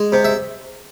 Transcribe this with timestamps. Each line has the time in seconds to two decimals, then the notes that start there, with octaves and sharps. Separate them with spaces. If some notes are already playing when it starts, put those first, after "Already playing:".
Already playing: G#3
0.12 C3
0.25 E5